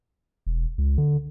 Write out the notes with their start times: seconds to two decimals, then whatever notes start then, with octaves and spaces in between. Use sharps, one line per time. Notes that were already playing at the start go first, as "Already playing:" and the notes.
0.47 E1
0.78 C#2
0.98 D3